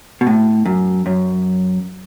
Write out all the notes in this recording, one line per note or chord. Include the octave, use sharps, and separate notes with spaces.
B2
A2
F#2
F#2